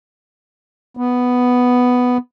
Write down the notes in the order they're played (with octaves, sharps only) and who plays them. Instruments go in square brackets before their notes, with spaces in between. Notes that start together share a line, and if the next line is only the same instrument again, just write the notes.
[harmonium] B3